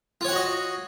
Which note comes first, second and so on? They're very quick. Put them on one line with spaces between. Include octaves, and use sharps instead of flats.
F4 C#5 F#5 F#4 D#5